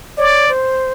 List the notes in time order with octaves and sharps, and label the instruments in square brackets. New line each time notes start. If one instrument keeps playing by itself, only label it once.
[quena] C#5 [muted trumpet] D5
[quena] C5